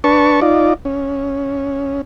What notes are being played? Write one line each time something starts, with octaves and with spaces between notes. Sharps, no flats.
D4 B4 A5 C#6
D#4 F4 D5
C#4